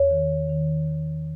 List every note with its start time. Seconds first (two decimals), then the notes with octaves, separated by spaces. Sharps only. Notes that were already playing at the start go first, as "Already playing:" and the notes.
Already playing: E2 C#5
0.11 D#3
0.49 D#3
0.88 D#3